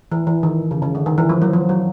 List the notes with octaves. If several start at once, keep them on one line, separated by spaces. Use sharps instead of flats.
E3
E3
D#3
C#3
C#3
D3
D#3
E3
F3
F#3
F3
F#3